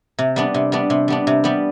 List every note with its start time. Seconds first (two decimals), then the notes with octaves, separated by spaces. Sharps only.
0.19 C3
0.36 G3 B3 D4
0.54 C3
0.72 G3 B3 D4
0.90 C3
1.08 G3 B3 D4
1.27 C3
1.44 G3 B3 D4